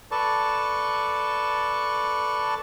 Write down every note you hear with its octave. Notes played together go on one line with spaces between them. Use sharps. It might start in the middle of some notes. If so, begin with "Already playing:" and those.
A4 B4 D5 A5 C#6